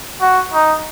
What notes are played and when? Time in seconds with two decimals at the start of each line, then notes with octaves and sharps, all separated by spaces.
0.22 F#4
0.53 D#4